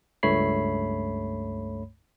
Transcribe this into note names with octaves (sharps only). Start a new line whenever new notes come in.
C#2 G2 A3 C#5 B5 C7